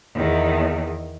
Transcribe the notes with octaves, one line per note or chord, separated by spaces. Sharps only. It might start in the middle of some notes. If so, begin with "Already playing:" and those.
E2 D#3